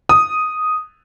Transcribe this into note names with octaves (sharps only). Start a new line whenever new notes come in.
D#6